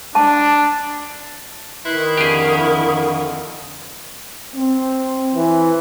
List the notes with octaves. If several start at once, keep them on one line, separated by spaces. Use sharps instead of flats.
D4 A5
D#3 E4 B4 C6 F#6
F2 D3 G4 G#4
C4
E3